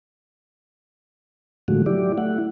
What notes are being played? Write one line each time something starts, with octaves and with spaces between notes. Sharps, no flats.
A2 D3 F3 G#3 A3 F#4
F#3 E4 G4 D5
A3 E4 F#5